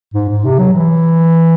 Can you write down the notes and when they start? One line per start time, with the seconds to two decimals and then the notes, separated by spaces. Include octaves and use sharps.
0.14 G#2
0.29 G#2
0.44 C3
0.59 F#3
0.73 E3